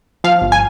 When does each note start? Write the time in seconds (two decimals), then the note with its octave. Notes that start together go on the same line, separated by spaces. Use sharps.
0.24 F3 F5
0.42 G1
0.52 G#5